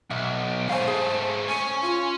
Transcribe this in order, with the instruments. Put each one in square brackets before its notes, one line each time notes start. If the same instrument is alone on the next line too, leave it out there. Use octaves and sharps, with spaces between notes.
[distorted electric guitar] B1 [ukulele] E5
[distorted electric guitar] G#2 A3 [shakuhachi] C5 [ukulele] F5 G#5
[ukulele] G#4
[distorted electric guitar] C#4 [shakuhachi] G#5
[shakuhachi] F4